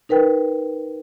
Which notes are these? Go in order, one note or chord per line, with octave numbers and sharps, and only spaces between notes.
D#4 A#4 B4 G5